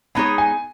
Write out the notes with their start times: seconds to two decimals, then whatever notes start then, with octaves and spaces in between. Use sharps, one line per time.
0.15 G#3 B3 D#4 G#4 C#5 B5
0.38 G#5